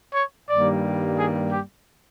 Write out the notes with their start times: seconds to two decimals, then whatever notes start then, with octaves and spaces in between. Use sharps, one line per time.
0.14 C#5
0.48 G2 D#3 G3 A#3 D5
1.17 G#4
1.51 G4